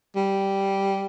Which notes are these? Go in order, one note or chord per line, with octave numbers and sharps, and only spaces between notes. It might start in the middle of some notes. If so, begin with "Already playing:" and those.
G3